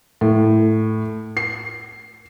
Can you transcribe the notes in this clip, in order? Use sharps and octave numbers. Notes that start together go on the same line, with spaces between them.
A2
C7